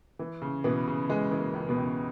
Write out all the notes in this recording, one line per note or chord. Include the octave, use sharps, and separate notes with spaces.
E3
C#3
B2 E3 B3
C#3
E3 G#3
E3
A#3
C#2
B2 B3
C#2